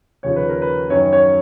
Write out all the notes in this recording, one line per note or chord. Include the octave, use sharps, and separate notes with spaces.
D#2 C#3 F3 C#5
B4
A#4
B4
F#2 D#3 F#3 C#5
C#5